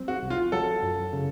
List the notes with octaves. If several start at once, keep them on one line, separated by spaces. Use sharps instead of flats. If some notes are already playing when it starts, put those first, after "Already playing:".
Already playing: F#3 C4
F#4
C2
F4
F#3 A4
F#2
C#3